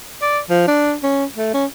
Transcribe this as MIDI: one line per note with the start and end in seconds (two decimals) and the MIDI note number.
0.22 0.39 74
0.50 0.68 53
0.68 0.94 62
1.03 1.25 61
1.37 1.51 57
1.54 1.65 61